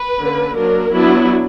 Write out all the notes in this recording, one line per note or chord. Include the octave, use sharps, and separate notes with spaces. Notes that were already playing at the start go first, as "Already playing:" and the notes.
Already playing: B4
D3 A#3 C#4
F#3 A#3 D4 A#4
F#3 B3 D4 E4